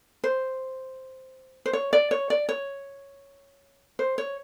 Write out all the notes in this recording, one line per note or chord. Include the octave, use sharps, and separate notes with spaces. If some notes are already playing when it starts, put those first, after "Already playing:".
C5
C5
C#5
D5
C#5
D5
C#5
C5
C#5